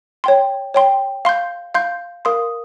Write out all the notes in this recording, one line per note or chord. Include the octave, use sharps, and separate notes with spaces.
C#5 G5 C6
C#5 G5 C6
F5 C6 G6
F5 C6 G6
A#4 F5 C6 D#6